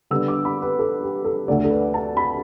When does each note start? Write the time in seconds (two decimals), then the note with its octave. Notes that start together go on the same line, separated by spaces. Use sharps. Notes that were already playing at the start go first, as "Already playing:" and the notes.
0.11 D3 G3 B3 D4 E6
0.28 D6
0.45 B5
0.62 B4
0.79 A4
1.03 G4
1.25 A4
1.48 D2 D3 A3 D4 D5
1.64 A4
1.70 B4
1.94 A5
2.17 B5